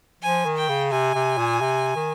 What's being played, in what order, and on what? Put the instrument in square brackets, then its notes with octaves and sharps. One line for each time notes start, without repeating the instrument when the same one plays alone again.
[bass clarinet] F3 [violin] G#5
[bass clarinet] D#3
[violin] G5
[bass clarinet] C#3
[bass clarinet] C3 [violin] G#5
[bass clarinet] C3
A#2
C3
D#3